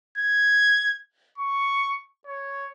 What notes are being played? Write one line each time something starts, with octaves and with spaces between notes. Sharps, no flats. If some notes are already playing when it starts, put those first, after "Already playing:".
G#6
C#6
C#5